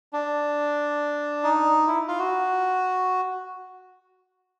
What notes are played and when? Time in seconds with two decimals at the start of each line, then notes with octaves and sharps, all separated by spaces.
0.13 D4
1.44 D#4
1.87 E4
2.08 F4
2.19 F#4